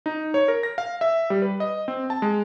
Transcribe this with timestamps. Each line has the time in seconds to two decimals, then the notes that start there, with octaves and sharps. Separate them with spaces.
0.06 D#4
0.34 C#5
0.48 A#4
0.63 A#6
0.78 F5
1.01 E5
1.30 G3
1.42 B4
1.60 D#5
1.88 C4
2.10 A5
2.22 G#3